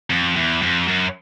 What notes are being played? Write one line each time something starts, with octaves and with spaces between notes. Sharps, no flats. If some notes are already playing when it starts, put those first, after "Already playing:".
F2
E2
F2
F#2